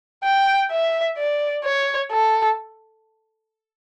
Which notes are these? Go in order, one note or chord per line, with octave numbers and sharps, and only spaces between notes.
G5
E5
D5
C#5
A4